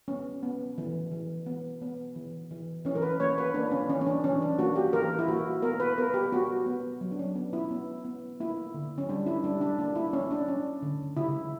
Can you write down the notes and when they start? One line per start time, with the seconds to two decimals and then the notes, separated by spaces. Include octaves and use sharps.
0.08 B3 C#4
0.43 B3
0.78 E3
1.11 E3
1.46 B3
1.82 B3
2.16 E3
2.51 E3
2.85 E3 C#4
2.95 A#4
3.02 B4
3.20 A#3 C#5
3.38 B4
3.54 A#3 D4
3.71 C#4
3.89 E3 C#4
4.01 C#4
4.07 D4
4.24 E3 C#4
4.42 D4
4.58 A#3 F#4
4.76 G4
4.93 E3 A#4
5.19 E4
5.28 A#3 F#4
5.63 B3 A#4
5.80 B4
5.98 B3 A#4
6.14 G4
6.32 B3 F#4
6.66 B3
7.01 F#3
7.12 D4
7.19 C#4
7.35 B3
7.53 E4
7.71 B3
8.05 B3
8.40 A#3 E4
8.74 D3
8.98 C#4
9.09 G3 D4
9.26 E4
9.44 G3 D4
9.61 D4
9.79 A#3 D4
9.96 E4
10.13 C#4
10.31 D4
10.48 C#4
10.82 D3
11.17 C#3 E4